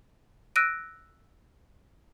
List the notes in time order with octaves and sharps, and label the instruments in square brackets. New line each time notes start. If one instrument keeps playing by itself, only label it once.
[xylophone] E6 F#6 A#6 D7 D#7